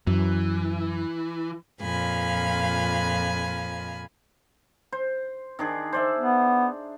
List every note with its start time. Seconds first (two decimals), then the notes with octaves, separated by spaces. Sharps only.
0.07 F#2 E3
1.81 F2 A#2 F5 G#5 B5
4.92 C5
5.59 D#3 D4 G#4
5.93 C5 D5 E5
6.18 B3